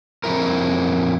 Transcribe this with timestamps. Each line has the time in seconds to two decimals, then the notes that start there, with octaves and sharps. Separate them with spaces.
0.24 F2 C#3 E4 A#4